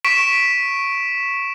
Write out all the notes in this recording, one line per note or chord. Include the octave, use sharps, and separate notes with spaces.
C#6 B6 D7 E7